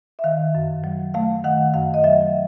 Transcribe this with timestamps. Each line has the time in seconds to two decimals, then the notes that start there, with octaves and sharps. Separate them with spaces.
0.19 E5
0.24 D#3 F5
0.55 F#2
0.84 F#3
1.14 A3 F5
1.44 D#3 F#5
1.74 F#2 F5
1.94 D#5
2.04 F#3 E5